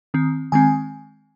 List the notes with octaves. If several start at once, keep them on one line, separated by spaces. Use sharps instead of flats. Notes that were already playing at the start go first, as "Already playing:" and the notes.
D#3 C4
D#3 G#3 C4 G#5